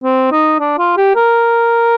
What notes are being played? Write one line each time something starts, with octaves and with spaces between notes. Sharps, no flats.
C4
D#4
D4
F4
G4
A#4